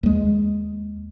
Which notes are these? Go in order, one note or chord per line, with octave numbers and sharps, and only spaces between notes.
D#2 G#3